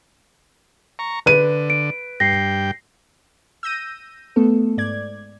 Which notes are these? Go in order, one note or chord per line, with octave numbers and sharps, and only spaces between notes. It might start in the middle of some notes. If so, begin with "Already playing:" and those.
A#5 C#6
D3 B4 D#7
D7
G2 G5 A#6 C7
E6 G6 A#6 D#7
A3 B3 A4
G#2 D5 G#6